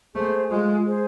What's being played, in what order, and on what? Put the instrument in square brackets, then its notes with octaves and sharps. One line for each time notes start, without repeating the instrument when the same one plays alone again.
[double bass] A3 [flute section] G#4 C5
[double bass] G#3 [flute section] F4
[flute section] G#4 C5